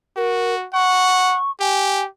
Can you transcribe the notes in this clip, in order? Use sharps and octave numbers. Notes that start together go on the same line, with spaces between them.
F#4 A#4
F#5 C#6
G4 G#5